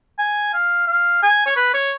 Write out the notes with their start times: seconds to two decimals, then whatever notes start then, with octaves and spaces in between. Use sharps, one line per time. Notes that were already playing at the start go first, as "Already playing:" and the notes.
0.19 G#5
0.54 F5
0.87 F5
1.23 G#5
1.46 C#5
1.56 B4
1.74 C#5